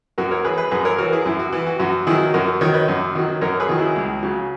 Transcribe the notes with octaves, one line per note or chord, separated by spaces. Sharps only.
F#2 F#4 A#4
A#4 C#5
E3 G#4 B4
G#4 B4
F#2 G#4 B4
A#4 C#5
E3 F#4 A#4
E4 G#4
F#2 E4
F#4
E3 E4
F#4
F#2 F#4
D#3 F#3 E4 G#4
F#2 F#4 A#4
D#3 F#3 A#4 C#5
B4 D#5
F#2
D#3 F#3
F#2 A#4 C#5
G#4 B4
D#3 F#3
E4 G#4
C#2
C#3 F#3